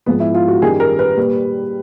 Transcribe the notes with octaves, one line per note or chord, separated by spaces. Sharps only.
G#2 F3 G#3 B3
E4
F4
F#4
F#2 D#3 G3 G#4
A#4
B4
A#2 G3